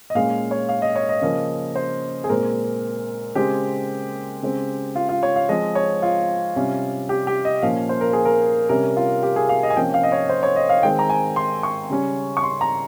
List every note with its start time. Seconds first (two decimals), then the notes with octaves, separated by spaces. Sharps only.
0.10 D#5
0.15 A#2 G#3 C#4 F5
0.51 C#5
0.69 F5
0.82 D#5
0.96 C#5
1.09 D#5
1.21 C#3 F3 A#3 C#4
1.76 C5
2.24 G#4
2.29 A#2 G#3 C4 A#4
3.35 C#3 G#3 C4 G4
4.42 C#3 G#3 C4
4.95 F4
5.09 F4
5.23 C#5
5.36 F5
5.49 F3 G#3 C4 D#5
5.75 C#5
6.02 F4
6.56 C3 G3 C#4
7.09 G4
7.27 G4
7.45 D#5
7.62 A#2 F3 A#3 C#4 F5
7.89 C5
8.01 A#4
8.13 G#4
8.25 A#4
8.69 C3 G3 C#4 A#4
8.97 F4
9.23 G4
9.36 G#4
9.49 F5
9.63 D#5
9.70 G#5
9.76 C3 F3 A#3 C#4 G5
9.94 F5
10.03 D#5
10.12 C#5
10.30 C5
10.43 C#5
10.56 D#5
10.70 F5
10.83 D#3 G#3 C4 G5
10.99 A#5
11.09 G#5
11.36 C6
11.63 C#6
11.90 C#3 G3 C#4
12.37 C#6
12.43 C6
12.61 A#5